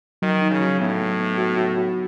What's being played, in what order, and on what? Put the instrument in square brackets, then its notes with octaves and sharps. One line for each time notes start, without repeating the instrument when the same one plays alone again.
[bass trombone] D#3 [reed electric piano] F#3
[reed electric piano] D#4
[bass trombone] C#3
[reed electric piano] F#3
[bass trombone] A2 [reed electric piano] B3
[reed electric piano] B3
B3
F#4
F#4
F#4